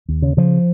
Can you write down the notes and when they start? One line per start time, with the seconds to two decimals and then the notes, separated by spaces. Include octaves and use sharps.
0.09 D#2
0.22 C#3
0.37 C#3 F3